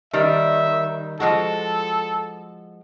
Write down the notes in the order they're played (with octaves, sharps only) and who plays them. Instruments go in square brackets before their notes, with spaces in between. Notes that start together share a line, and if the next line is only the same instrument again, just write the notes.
[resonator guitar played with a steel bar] D#3 G3 [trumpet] E5
[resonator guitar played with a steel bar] F3 G#3 F#4 [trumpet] A4